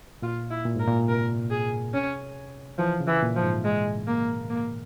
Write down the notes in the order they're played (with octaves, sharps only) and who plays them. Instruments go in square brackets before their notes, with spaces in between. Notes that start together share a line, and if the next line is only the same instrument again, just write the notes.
[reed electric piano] A#2 [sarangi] F4
[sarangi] E4
[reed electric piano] A#2
[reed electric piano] G#2 [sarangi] A#4
[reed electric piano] A#2
[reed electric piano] C3 [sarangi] A#4
[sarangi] G#4
C#4
[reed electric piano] E3 [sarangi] F3
[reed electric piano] C#3
[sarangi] E3
[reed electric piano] A#2
[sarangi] F3
[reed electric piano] G#2
[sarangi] G#3
A#3
A#3